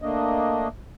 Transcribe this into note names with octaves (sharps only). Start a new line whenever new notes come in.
A3 A#3 D4 D#5